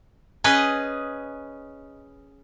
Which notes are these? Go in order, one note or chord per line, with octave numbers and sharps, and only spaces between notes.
C#4 G#4 B4 D#5